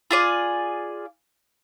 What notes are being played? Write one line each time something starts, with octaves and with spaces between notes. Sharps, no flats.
F4 G#4 D5